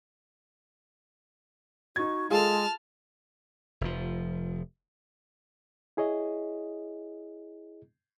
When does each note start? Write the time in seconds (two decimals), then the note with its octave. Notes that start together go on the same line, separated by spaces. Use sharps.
1.96 D#4 F#4 G#6
2.30 G#3 F4 G#4 A4 A5 F6
3.81 F1 F3
5.97 E4 G#4 C#5 D#5